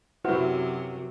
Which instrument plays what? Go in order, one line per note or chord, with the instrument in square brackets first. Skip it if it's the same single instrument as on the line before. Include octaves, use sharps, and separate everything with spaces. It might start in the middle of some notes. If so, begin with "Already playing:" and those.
[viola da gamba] F#2 C3 F#3 [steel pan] E4 F#4 C5 [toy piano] B4 F#5